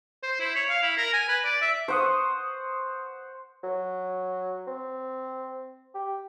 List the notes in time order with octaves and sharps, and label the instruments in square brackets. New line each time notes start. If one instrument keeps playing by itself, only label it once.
[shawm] C5
E4
C#5
F5
E4
A#4
G#5
B4
D5
E5
[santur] C5 F#5 [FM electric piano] C6 C#6 D#6
[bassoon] F#3
C4
G4